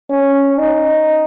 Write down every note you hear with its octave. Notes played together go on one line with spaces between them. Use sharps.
C#4
D#4